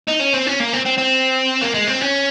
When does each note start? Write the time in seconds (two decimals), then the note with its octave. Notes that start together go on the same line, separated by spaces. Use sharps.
0.08 D#4
0.21 C#4
0.34 C4
0.47 C#4
0.60 A#3
0.73 C4
0.85 C4
0.98 C4
1.62 A#3
1.74 G#3
1.87 C4
2.01 C#4